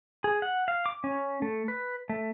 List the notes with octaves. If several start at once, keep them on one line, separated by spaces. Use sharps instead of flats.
G#4
F#5
F5
D6
C#4
A3
B4
A3